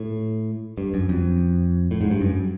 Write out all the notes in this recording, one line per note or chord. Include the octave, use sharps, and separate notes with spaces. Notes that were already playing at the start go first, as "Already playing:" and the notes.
Already playing: A2
G2
F#2
F2
A2
G#2
G2
F#2